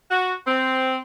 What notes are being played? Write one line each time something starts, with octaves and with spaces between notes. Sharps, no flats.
F#4
C4